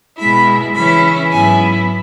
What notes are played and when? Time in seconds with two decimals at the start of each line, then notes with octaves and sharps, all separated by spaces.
0.18 B2 G#3 E4 B5
0.74 C#3 E3 C#4 E4 B5
1.31 G#2 F#3 B3 E4 G#5